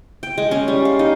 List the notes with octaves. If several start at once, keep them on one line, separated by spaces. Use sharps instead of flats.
G5
G#3
C#4
G3
F5
D#4